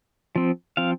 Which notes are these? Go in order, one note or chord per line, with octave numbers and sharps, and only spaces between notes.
F3 C4
F3 C4 F5